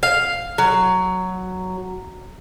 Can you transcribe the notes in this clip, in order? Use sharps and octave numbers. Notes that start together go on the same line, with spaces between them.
F5
F#3